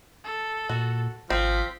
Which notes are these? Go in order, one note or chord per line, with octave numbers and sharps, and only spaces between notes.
A4
A#2 F#4
G#1 F3 C4 B6